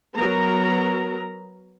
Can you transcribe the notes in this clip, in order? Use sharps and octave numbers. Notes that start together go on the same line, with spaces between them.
F#3 B3 A#4 A#5